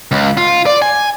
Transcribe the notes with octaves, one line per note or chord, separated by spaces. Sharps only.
C#2
F4
D5
G#5